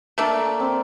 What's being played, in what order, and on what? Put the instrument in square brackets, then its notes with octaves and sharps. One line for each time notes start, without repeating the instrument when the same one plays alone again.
[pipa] A3 D4 A4 [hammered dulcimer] A#3
[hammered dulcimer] C4